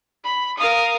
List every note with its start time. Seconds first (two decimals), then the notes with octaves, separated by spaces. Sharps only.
0.24 B5
0.57 A#4 F5 D#6